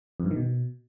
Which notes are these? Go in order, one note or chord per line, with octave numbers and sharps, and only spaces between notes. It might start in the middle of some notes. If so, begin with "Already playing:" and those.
F2
G2
D#3
B2